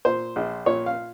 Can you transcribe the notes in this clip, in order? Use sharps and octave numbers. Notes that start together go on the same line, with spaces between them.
A#2 C5
A#1
A#2 C#5
F5